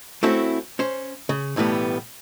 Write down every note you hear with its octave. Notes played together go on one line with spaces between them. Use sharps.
A3 C4 C#4 E4 F#4
C#4 C5
C#3
B1 A2 E3 G3 B3